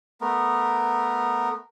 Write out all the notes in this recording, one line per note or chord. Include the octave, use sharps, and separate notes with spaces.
A3 B3 A#4